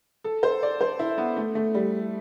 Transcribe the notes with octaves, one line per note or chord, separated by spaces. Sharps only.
A4
C5
D5
C5
E4
B3
A3
A3
G3